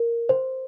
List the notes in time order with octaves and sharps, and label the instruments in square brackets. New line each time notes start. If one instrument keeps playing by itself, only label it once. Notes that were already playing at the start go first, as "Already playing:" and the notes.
Already playing: [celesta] A#4
C5